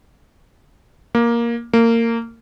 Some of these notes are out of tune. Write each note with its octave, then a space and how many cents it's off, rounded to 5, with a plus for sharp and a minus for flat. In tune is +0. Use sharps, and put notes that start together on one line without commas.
A#3 +10
A#3 -20